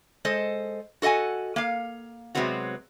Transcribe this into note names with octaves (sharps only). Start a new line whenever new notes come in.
G#3 A4 C5 D#5
F#4 A4 D#5 F#5 G#5
A#3 F5
C3 F#3 G#3 B3 C4 F#4